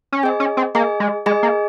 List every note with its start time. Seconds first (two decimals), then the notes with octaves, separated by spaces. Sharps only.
0.12 C#4
0.23 C4 G#4 D#5 G#5
0.40 C#4
0.57 C4
0.75 A#3 G#4 D#5 G#5
1.00 G#3
1.26 G#3 G#4 D#5 G#5
1.43 A#3